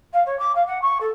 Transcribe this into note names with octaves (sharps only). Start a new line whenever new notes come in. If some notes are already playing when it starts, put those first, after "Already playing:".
F5
C#5
D6
F5
F#5
C#6
A4